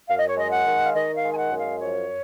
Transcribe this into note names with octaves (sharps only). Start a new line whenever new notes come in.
F#2 F5
D#5
C#5
G#3 D#5
F#5
D#3
F5
D#3 D#5
F5
G#3
G#5
F#5
F#2
F5
F3 C#5